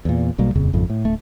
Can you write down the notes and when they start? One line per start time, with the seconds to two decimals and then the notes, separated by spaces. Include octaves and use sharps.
0.05 E2 A#2
0.38 B1 B2 G3 A#3
0.55 D#1 F2 C#3
0.73 G#1 F2 C#3
0.90 A2
1.05 D1 A3